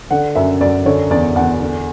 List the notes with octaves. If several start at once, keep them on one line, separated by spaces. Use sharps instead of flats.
D3 F#5
F#2 E5
F#2 D5
D3 C#5
E2 D5
E2 F#5
D3